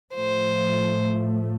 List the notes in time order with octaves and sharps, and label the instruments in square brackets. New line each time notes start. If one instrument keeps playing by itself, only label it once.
[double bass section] A2 F3 A3 [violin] C5